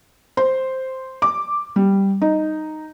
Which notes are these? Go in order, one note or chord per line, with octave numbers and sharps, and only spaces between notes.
C5
D6
G3
D#4